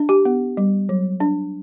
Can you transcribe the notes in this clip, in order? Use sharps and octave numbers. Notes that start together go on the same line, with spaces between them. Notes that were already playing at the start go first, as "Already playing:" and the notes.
Already playing: D4
G4
B3
G3
F#3
D4